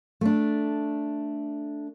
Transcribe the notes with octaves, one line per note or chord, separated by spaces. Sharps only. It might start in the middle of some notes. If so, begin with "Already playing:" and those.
A3 D4